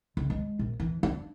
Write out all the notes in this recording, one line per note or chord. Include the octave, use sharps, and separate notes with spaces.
C#2
G#3
A#1
E3
D4